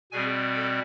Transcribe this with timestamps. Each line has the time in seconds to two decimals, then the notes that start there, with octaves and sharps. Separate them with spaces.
0.12 B2 G3 C4 G#4 G#5
0.54 A4